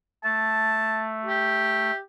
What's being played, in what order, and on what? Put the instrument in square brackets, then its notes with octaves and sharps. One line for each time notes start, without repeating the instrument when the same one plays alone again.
[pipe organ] A3 [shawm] A5
[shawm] G4